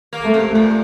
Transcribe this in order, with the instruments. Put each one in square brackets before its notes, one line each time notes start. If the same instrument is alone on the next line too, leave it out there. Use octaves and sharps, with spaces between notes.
[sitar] A#3
[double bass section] A3
[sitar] C3
A#2